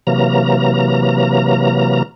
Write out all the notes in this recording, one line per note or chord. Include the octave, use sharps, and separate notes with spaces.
C3 E3 F#3 A#3 A#5